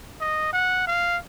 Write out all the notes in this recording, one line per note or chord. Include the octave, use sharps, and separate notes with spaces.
D#5
F#5
F5